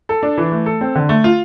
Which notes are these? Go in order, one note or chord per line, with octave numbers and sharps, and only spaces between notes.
A4
D4
E3
A3
A4
C4
D3
A3
F4